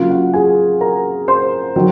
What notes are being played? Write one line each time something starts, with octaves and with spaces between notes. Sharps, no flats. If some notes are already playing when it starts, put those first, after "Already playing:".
Already playing: C#3 F#3 A#3 F4 F5
F#4 F#5
G#4 G#5
A#4 A#5
C5 C6
D#3 F#3